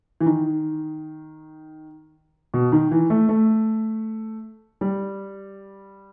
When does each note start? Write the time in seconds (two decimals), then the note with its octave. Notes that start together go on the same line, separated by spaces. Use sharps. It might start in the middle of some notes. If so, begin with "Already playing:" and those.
0.21 E3
0.26 D#3
2.54 B2
2.72 D#3
2.92 E3
3.10 A3
3.29 A3
4.81 G3